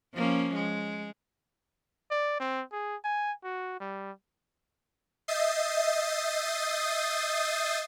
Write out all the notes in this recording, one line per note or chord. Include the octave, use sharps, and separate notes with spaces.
F3 A#3 C#4
G#3
D5
C4
G#4
G#5
F#4
G3
D#5 E5 D#6 G6 A6 C7